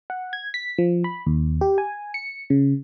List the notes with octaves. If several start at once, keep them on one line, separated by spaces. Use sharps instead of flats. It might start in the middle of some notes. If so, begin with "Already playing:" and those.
F#5
G#6
B6
F3
B5
D#2
G4
G#5
C#7
C#3